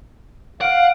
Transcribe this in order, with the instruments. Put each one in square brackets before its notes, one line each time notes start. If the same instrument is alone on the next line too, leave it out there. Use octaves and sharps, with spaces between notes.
[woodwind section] F5 [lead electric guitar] F#5 [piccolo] D7